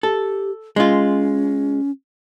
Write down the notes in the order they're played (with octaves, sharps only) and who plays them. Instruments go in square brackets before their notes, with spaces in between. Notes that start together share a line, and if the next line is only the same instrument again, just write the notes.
[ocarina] G4 [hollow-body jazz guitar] A4
[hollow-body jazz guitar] G#3 F4 [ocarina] C#4